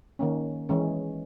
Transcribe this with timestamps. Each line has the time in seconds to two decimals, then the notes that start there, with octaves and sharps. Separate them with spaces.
0.19 D#3 A#3 C#4
0.69 E3 G#3 C#4